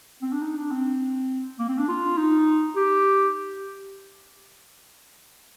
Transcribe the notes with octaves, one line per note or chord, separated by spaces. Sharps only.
C4
D4
D#4
D4
C4
A#3
C4
D4
F4
D#4
G4